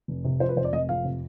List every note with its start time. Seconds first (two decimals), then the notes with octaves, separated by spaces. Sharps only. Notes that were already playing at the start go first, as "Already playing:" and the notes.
0.08 F1
0.24 C3
0.40 F3 C5
0.49 B4
0.56 F1 C5
0.64 D5
0.73 F1 D#5
0.89 F2 F5
1.05 C3